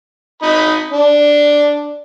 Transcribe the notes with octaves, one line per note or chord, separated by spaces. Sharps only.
D#4 D#5 B5
D4